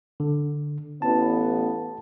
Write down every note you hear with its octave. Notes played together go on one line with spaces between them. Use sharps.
D3
A1 B3 A5